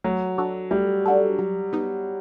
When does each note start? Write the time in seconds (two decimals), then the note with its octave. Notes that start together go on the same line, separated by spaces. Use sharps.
0.04 F#3 A3
0.38 D4 F#4 A4
0.71 G3 A3
1.05 D4 F#4 A4
1.39 F#3
1.73 B3 D#4